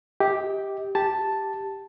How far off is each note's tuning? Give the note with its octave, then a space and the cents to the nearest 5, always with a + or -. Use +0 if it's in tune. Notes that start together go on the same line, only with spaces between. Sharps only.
G4 +0 D#5 +35
G4 +0 A5 +0